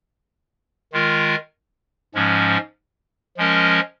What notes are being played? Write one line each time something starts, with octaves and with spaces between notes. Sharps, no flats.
D#3 G#3 F4 A#4
G#2 F3 G#3 C#4
F3 G#3 C#4 A#4 D#5